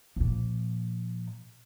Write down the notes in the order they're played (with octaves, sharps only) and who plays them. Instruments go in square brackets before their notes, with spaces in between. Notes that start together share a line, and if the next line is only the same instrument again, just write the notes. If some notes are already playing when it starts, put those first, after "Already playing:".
[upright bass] A#2 F3